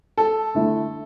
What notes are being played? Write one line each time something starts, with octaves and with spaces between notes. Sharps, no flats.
A4
D3 A3 E4